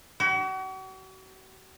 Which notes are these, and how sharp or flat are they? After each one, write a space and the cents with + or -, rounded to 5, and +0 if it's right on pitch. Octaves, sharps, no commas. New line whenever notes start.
F#4 +40